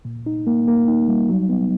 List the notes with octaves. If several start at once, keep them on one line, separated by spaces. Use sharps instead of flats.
A#2
D#4
A#3
A#3
D#4
G3
F#3
B3